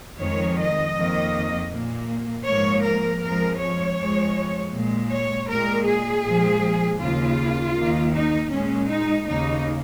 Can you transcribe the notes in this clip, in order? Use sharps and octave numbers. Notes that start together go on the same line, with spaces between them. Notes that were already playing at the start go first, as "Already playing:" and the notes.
F2 D#3 G#3 C#5
D#5
F2 D#3 A#3
A#2 A#3
G#2 F3 A#3 C#5
A#4
F2 F3 G#3 A#4
C#5
F2 F3 G#3
A#2 G#3
C#5
A#2 G#3 A#4
G#4
A#2 F3 G#3
D#2 C#3 A#3 F4
D#2 D#3 A#3
D#4
A#2 G#3 C#4
D#4
D#2 C#3 A#3 D#4